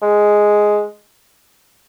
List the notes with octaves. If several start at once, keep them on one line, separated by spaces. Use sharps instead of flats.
G#3